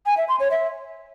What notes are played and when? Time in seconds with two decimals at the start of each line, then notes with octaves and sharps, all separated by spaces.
0.06 G#5
0.17 E5
0.28 C6
0.40 C#5
0.51 E5